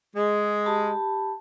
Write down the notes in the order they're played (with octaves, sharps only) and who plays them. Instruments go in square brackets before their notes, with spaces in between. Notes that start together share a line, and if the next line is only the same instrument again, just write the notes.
[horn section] G#3
[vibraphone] G4 A5 B5